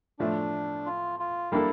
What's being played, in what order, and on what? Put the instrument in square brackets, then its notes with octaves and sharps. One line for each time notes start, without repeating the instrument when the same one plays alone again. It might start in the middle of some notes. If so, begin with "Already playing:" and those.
[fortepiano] A2 F3 A3 [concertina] D4
[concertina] F4
F4
[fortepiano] G3 A#3 D4 A4 [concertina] E4